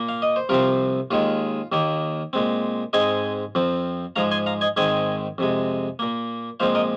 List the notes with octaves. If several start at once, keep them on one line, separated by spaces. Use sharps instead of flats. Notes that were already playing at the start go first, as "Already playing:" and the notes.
Already playing: A#2 A#3
F5
D#5
C5
C2 C3 F3 C4 F4 A#4
D#2 D#3 G#3 F4
D#2 D#3 A#3
A#2 G#3 C4
G#2 G#3 C4 D#5 G#5
F2 F3 C4
G#2 F3 G#3 F5 A#5
G#5 C6
F5 A#5
D#5 G#5
G#2 D#3 G#3 C4 D#5 G#5
F2 C3 G#3
A#2 A#3
A#2 F3 G#3 C4 C5 F5
A#4 D#5